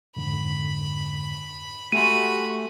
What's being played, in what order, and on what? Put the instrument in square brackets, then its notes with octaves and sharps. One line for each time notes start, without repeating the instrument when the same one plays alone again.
[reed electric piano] F2 G#2 D3 [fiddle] B5
[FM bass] A3 [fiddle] F#4 B5 [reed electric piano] G4 G#5 C6 [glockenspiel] D#7